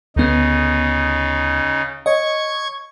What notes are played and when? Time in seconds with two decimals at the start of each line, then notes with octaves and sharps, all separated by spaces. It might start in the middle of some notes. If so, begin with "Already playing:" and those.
0.16 D2 C#3 B3 D#4
2.06 C#5 D#5 C#6 G#6